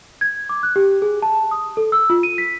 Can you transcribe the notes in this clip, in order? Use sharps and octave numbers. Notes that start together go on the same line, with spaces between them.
G#6
D6
F#6
G4
G#4
A5
D#6
A4
E6
F4
D#7
B6